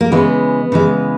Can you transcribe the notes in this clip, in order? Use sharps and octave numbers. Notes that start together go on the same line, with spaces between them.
A#3
C#3 E3 G#3 B3
C#3 E3 G#3